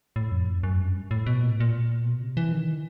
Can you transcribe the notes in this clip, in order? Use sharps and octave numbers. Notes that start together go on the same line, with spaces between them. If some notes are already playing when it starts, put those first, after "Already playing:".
A2
F2
F#2
G2
A2
B2
A#2
A2
A#2
B2
C3
E3
D#3